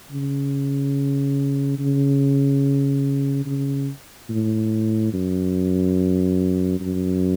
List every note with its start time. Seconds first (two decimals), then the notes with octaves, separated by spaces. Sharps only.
0.12 C#3
1.79 C#3
3.46 C#3
4.30 A2
5.13 F#2
6.80 F#2